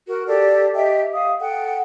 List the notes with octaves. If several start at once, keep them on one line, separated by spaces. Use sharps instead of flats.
F#4 A#4
G4 A4 D5
G4 D#5 E5 G5
F5 D#6
A4 F#5 G5